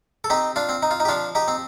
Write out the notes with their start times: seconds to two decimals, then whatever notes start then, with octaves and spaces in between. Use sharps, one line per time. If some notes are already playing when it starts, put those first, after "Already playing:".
0.24 A4
0.30 C4 D#4 G4
0.56 D4 F4
0.69 C4
0.83 D#4
0.91 F4
1.00 D#4
1.05 G4
1.08 F3 D4 F4
1.35 D#4 G4
1.48 C4